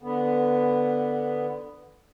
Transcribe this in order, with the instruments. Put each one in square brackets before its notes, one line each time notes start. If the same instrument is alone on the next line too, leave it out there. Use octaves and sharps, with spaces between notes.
[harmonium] D3 B3